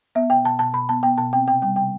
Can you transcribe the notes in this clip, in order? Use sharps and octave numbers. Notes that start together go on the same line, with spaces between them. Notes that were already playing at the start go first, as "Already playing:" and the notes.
B3 E5
B2 G5
B2 A5
B2 A5
B2 B5
B3 A5
B3 G5
B2 A5
C4 G5
C3 G5
G3 G5
C3 G5